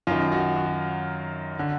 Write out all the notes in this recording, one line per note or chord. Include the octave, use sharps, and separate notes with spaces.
F#2 D#3 F4
F#4
F#4
D3